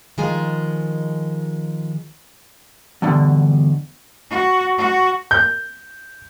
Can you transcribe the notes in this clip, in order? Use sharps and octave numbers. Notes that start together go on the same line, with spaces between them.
D#3 F3 G#3 G#5
E2 G2 B2 D3
F#4
F#4
G6